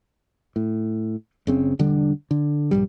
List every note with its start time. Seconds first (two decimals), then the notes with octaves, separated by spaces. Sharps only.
0.56 A2
1.47 F#1 C#3 C4
1.79 E1 D3 G3 D4
2.31 D3
2.71 A#1 G2 G3